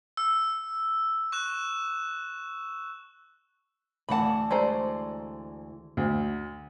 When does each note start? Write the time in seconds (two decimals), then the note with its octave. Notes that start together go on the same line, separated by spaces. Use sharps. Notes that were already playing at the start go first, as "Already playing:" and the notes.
0.17 E6
1.32 C#6 F#6 E7
4.09 D2 E3 F#5 A5 B5
4.51 G#3 A3 C5 D5 A#5
5.97 D2